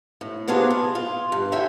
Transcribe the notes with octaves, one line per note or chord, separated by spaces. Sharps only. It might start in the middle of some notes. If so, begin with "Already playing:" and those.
A2
C3 F#3 B3 D4 F4 G#4
G#4
F4
G2
D3 E4 C#5 E5 G5 G#5